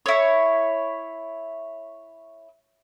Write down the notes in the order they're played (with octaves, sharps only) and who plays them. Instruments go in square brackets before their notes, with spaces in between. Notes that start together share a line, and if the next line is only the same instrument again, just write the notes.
[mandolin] E4 C#5